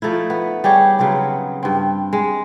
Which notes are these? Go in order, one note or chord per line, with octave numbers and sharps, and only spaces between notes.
F3 A3 D#4 E4
B3
G3 G4 G#4 C#5
C#3 F#3 B3 C4
G2 C4
G#3